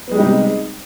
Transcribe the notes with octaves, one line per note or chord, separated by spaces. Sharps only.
C3 G3 G#3 B3 D#4